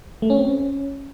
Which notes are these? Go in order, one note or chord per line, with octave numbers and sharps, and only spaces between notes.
A3
C#4
C4
C#4